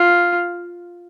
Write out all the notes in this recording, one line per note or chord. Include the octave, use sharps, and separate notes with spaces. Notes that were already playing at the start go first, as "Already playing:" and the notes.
Already playing: F4